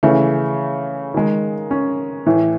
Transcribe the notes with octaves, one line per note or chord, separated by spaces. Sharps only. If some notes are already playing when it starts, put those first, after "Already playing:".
C#3 E3 A3
D#3 G#3
C#4
A2 E3 A3